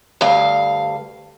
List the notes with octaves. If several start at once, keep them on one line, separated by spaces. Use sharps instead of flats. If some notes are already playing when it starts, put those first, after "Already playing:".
D2 G2 F5